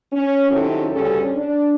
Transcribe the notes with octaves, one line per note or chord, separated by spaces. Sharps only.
C#4
C3 D#3 F#3 C#4 E4 A4
D2 G2 C#3 C#4 G4 A4
D4